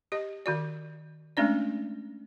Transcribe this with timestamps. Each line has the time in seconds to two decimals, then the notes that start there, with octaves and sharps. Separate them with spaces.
0.12 G4 D#5
0.46 D#3 F#4 D5
1.37 G#3 A3 C#4 D4 D5